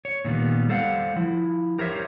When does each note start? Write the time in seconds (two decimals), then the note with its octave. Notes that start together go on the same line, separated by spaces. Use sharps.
0.05 C#5
0.25 A#2 D#3 G3 B3
0.69 G3 A4 C5 F5 F#5
1.16 F3 E4
1.79 G4 A#4 C5 C#5 E5